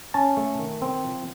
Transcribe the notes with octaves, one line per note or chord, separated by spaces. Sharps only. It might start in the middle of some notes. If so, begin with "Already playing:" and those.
C#4 A5
A3
D#3
C4
F3